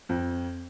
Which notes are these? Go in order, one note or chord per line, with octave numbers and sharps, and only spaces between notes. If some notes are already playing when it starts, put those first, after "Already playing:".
F2